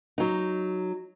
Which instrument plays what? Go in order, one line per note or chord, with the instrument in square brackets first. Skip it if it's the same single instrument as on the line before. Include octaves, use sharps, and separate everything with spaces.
[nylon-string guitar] F#3 D#4